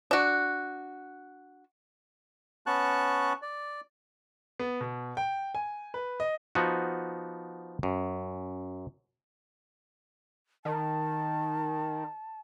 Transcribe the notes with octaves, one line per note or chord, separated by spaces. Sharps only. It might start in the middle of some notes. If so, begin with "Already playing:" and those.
D4 F#4
B3 C#4 A5 C#6 F#6
D5
B3
B2
G5
G#5
B4
D#5
F3 B3 D#4 F#4
F#2
D#3 A5